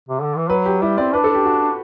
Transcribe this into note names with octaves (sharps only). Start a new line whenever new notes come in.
C3
D3
E3
F#3 B4
G4
G3 E4
C4 D5
D4 B4
A4
G4
F#4